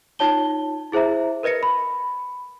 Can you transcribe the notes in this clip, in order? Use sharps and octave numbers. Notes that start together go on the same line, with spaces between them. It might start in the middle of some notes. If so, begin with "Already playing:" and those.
D#4 F4 C#5 A5 G7
E4 G#4 C5 E5 A#5
A#4 B4 D#5 A#6 C#7
B5